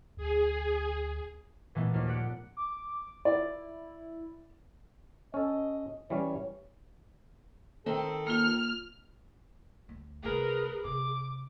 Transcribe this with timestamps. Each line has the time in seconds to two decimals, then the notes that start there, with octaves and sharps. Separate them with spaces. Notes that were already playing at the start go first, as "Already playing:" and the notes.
0.17 D2 G#4
1.75 A#2 E3 G#3 A3 B3 F4
1.93 D#2 F3 F6
2.07 G4 D5 F#5 F#6 C#7 D7
2.57 D6
3.25 E4 D5
5.34 C#4 A4 D#5
6.10 E3 G3 C#4 C#5
7.86 D#3 C4 A4
8.27 A#3 F4 F6
9.89 D2
10.23 C2 A3 G#4 A#4 B4
10.84 C3 D6